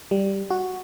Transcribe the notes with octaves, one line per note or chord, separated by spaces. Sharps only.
G3
F#4